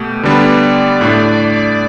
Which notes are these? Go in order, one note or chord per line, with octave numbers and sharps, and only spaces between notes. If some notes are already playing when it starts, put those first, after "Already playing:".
Already playing: B2 A3 G4
D3 G3 B3 D4 B4 D5
A2 A3 D4